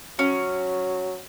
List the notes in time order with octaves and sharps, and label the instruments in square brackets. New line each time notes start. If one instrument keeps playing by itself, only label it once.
[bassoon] F#3 [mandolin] C#4